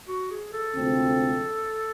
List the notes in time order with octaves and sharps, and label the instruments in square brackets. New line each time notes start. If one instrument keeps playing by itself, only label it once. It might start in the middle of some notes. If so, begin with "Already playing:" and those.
[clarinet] F#4
G#4
A4
[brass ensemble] D2 C3 F3 G#3 C4